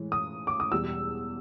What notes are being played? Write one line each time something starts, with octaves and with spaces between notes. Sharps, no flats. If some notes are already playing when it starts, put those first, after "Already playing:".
Already playing: A2 E3 G#3
D#6
D6
D#6
E2 B2 G3 E6